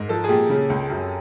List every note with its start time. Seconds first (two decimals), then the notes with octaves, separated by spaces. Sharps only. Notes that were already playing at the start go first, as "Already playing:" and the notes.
Already playing: G#2 A#4
0.09 F3 A4
0.24 G#4
0.29 A#2 G4
0.50 C#3
0.70 C#2
0.90 F#2